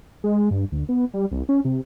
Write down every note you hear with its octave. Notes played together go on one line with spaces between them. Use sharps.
G#3
G2
D2
B3
G3
C2
C#4
C3